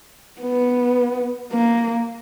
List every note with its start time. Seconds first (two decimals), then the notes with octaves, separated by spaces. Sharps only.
0.41 B3
1.53 A#3